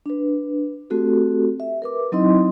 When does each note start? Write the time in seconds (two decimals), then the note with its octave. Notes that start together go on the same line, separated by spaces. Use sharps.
0.06 D4 B4
0.90 A3 C4 F#4 G4 A4
1.60 E5
1.82 A#4 B4 D6
2.12 F#3 C4 D#4 E4 D#5 C6